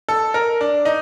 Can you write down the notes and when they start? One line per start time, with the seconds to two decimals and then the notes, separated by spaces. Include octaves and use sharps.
0.09 A4
0.34 A#4
0.61 D4
0.85 D#4